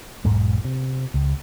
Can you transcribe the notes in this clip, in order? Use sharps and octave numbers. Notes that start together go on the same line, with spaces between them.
E1 B1 G#2 G#3
C3
C#2